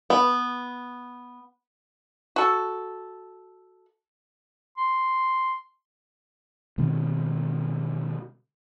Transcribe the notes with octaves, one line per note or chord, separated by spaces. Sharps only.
B3
F#4 A4
C6
B2 D#3 G#3 C4